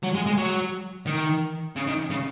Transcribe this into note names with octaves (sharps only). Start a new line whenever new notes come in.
F#3
G#3
G#3
F#3
D#3
C#3
D#3
C#3